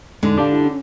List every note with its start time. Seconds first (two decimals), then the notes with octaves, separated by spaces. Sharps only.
0.23 E2 A2 D3 G#3 D#4
0.38 D4 G4 D5 F5 A5 D6
0.53 E4
0.65 C#4